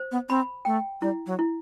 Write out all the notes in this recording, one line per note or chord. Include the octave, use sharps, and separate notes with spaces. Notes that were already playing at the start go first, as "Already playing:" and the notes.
Already playing: C5
B3
C4 B5
A3 G5
G3 E4
F#3
E4